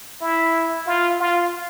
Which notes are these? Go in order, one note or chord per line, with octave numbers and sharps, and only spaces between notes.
E4
F4
F4